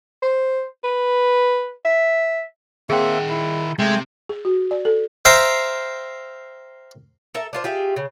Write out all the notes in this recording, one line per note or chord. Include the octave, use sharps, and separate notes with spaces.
C5
B4
E5
D#3 A#3 C4 G#4 E5 F#5 G5
E4
C3 G#3 A3 G5
G#4
F#4
D5
A4
C5 E5 F5 G5 A#5
A4 A#4 E5
D4 F4 C5
F4 G4 G#4 E5
C#3